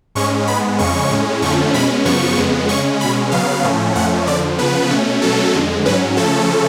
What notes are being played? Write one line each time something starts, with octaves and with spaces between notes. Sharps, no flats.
G#2 G#3 C#4 C#6
G#2 G#3 B3 B5
F2 C#3 G#3 C#4 C#6
A2 G#3 C#4
F2 D3 F3 A3 C#4 C#6
B2 G#3 C#4 B5
F#2 C#3 F3 B3 C#6
F2 C#3 G#3 B3
C#3 G#3 C#4 C#6
B2 G#3 C#4 B5
C#3 F#3 B3 F5
A2 F3 A3 C#4
F2 F3 A3 C#4 F#5
F2 D3 F3 D5
C#3 F3 B3 B4
B2 A3 C#4
B2 F#3 A3 C#4 A4
F2 D3 G#3
G#2 F#3 C#4 B4
C#3 F3 A3 C#4 A4